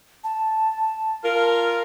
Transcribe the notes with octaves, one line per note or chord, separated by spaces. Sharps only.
A5
F4 A#4